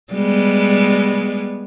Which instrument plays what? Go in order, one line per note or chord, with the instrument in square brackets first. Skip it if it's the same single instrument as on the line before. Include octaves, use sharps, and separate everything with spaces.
[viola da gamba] G3 G#3 B3